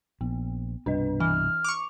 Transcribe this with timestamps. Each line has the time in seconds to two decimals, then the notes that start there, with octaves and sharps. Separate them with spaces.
0.21 A#1 B3
0.86 C2 G2 B2 D4 B4 D#5
1.20 E3 F6
1.64 C#6 D6 F7